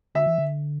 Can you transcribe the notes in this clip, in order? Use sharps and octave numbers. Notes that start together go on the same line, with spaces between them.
D3 E5
E3
D3